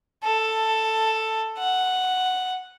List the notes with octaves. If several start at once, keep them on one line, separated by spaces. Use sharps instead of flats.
A4
F#5